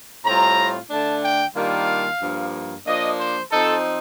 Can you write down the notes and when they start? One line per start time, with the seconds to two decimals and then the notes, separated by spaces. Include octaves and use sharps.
0.25 A2 G3 C4 F4 A#5
0.91 D3 A3 D4 A5
1.23 G5
1.55 D#3 G3 A#3 D4 F4 F5
2.21 G2 F3 A#3
2.86 F3 A#3 D4 D#5
3.19 C5
3.51 F3 C4 D#4 A4